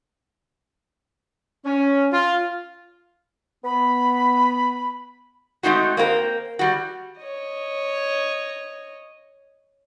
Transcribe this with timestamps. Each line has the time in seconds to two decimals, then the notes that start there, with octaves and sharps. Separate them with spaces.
1.65 C#4
2.12 F4
3.64 B3 B5
5.63 G#3 A3 C4 D#4 F#4
5.97 A#3 C4 F4 A#4
6.59 G3 F#4
7.21 C#5 D#5